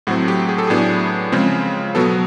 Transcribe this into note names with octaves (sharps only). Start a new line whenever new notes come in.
A2 F#3 A3 C4 F#4
G4
G#4
A4
A2 F#3 B3 D4 G#4
C#3 F3 G#3 C4
B2 F#3 B3 A4